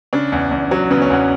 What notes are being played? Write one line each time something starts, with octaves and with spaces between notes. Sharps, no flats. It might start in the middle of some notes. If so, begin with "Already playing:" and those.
C#3 D4
E2
E2
F#3
C#3 B3
C#4
E2 B3